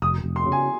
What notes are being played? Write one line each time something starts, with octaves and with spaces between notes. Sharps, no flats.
F1 D#6
F1
C6
C#3
G#5